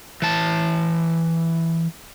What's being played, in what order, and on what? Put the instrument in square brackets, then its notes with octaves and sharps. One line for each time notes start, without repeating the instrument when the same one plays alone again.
[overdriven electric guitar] E3 A5